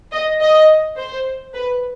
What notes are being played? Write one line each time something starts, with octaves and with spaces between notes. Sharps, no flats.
D#5
D#5
C5
B4